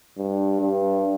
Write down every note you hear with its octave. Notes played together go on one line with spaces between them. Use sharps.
G2
G2